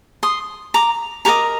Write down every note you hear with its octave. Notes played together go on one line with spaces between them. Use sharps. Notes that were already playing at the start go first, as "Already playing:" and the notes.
C6 D#6
A#5 D6
G4 A#4 D#5 A#5 D6